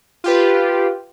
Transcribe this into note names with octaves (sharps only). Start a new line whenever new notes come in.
F4 G4 B4